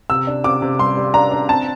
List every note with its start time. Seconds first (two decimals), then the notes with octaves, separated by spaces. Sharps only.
0.10 C3 E6
0.27 D4
0.44 C3 D6
0.62 C3
0.79 G3 C6
0.97 G3
1.14 D4 A#5
1.31 D4
1.49 C4 A5